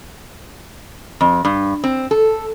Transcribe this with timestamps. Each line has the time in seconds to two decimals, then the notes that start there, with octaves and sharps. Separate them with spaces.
1.21 F2
1.45 G2
1.84 C4
2.11 A4